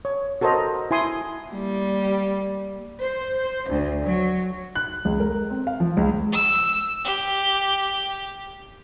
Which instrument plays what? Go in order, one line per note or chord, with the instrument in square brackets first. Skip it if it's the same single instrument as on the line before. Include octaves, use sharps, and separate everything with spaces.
[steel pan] C#5
F#4 A4 A#4 C5 D#5 A#5
E4 G#5 C6 D#6
[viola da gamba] G3 A#3
[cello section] C5
D2
F#3
[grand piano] F#6
C#2
A#4
C4
F5
F3
C#2
[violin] E6
G4